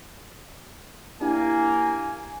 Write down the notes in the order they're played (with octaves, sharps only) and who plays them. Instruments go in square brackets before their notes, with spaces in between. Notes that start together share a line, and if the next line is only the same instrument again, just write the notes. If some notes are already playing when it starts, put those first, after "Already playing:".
[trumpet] A#3 [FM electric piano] D4 E4 G4 [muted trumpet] G#5